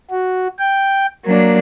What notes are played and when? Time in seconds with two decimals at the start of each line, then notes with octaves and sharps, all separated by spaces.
0.11 F#4
0.59 G5
1.26 F#3 A#3 D4